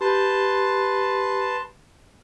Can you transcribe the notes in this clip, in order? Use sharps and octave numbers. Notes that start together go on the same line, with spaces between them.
G4 B4 A5 C6